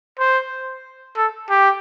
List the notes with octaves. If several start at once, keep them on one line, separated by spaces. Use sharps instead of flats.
C5
A4
G4